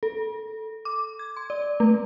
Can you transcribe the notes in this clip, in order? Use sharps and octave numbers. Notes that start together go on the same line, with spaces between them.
A4
D6
G#6
C6
D5
A3